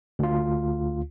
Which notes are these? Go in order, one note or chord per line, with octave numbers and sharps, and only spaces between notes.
D2 F4